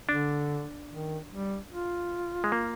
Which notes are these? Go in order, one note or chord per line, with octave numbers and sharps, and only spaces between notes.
D3 D4
D#3
G3
F4
G#3
A#3